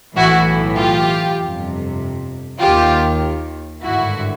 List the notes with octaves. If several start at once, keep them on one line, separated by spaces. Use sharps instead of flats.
B1 A2 E3 E4 F#4
F4 G4
G1 F2 C3
D#2 D#3 F4 G4
G#1 G2 D3 E4 F#4